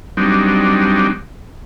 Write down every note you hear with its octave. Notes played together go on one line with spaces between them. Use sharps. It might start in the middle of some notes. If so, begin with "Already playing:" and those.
F#3 G3 C4 D4 D#4